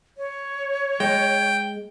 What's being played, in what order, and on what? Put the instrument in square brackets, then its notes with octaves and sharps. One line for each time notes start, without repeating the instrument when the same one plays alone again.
[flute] C#5
[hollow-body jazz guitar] G#3 [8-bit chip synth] G5